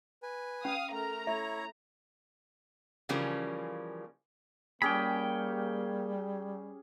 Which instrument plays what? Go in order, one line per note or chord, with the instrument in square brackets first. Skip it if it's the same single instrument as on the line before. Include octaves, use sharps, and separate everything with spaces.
[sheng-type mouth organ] B4 G#5
[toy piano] C#4 [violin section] F5 D#6
[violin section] A3 A#5 [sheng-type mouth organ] A#4
[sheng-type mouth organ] E4 C#5 [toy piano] E5
[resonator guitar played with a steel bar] C#3 E3 F3 G3 A#3 C#4
[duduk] G3 [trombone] A#3 [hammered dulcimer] C#4 G4 G#4 [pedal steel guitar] G5 B5